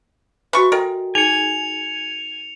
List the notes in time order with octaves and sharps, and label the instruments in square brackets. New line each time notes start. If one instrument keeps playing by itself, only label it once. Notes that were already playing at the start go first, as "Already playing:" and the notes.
[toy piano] F#4 E5 G#5 [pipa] B4 C#6
[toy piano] A4 D#5 G5 [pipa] A#4
[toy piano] D#4 G#4 [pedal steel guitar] G#5 [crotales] C#7 F7